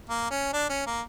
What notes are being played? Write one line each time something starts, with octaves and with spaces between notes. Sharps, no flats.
A#3
C#4
D4
C#4
A#3